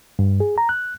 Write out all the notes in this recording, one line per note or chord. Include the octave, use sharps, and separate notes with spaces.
G2
G#4
A#5
F#6